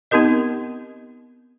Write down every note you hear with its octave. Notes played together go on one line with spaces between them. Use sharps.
B3 C4 D#4 G4 A#4 D#5